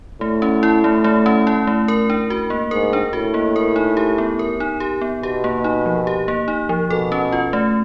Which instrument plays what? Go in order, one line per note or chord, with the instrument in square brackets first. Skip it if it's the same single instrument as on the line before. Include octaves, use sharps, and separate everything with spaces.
[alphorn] A2 [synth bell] A3
[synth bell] C#4
E4
A3
A3
C#4
E4
A3
A#4
D4
F#4
A#3
[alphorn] G#2 [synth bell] A#4
[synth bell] D4
[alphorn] A2 [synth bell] F#4
[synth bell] A#3
A#4
D#4
G4
B3
A#4
D#4
G4
B3
[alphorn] B2 [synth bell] G4
[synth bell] A#3
D#4
F3
G4
A#3
D#4
F3
[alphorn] B2 [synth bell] A4
[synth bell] C#4
F4
A3